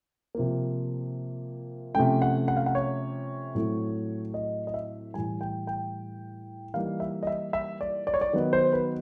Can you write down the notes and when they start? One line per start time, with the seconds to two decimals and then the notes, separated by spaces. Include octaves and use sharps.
0.35 C3 F3 A#3
1.95 C3 F3 A3 C#4 G5
2.22 F#5
2.48 F#5
2.57 F5
2.66 F#5
2.75 C#5
3.55 A2 F#3 A3 C4
4.34 D#5
4.67 D#5
4.74 E5
5.14 A2 E3 G3 G#5
5.41 G5
5.67 G5
6.74 E3 G3 A#3 D#4 F5
7.00 E5
7.23 D#5
7.27 E5
7.53 E5
7.81 D5
8.07 D5
8.14 C#5
8.21 D5
8.33 D#3 F#3 B3 D#4
8.53 C5
8.73 B4